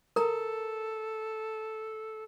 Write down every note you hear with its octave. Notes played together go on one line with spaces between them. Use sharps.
A4 A#4 A#5